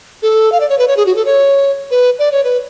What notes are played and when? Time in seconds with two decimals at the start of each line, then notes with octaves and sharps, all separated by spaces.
0.23 A4
0.52 F5
0.60 D5
0.69 C#5
0.78 B4
0.88 C#5
0.97 G#4
1.06 F#4
1.16 A4
1.25 C#5
1.91 B4
2.19 D5
2.32 C#5
2.44 B4